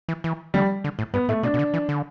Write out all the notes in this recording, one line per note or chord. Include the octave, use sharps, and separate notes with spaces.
E3
E3
D3 G3
D3
A2
G2 B3
A2 A3
B2 D4
B2
D3
E3
D3